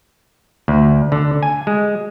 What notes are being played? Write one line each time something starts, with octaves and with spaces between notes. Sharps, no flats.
D2
D3
G#5
G#3